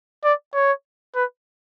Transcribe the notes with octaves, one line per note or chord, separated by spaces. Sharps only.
D5
C#5
B4